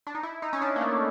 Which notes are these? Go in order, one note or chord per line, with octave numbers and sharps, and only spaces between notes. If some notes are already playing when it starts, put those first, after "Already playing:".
D4
D#4
E4
D#4
C#4
D4
A#3
A3